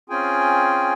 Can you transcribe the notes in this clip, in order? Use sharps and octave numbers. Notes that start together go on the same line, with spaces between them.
C4 C#4 F4 G#4 G5 G#5